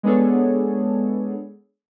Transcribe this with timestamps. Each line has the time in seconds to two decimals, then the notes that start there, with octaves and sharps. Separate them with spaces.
0.03 G#3 B3 D4 G#4 A4 C#5